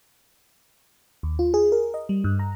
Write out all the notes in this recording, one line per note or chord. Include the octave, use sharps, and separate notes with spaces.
D#2
F4
G#4
A#4
D#5
G3
G2
A#5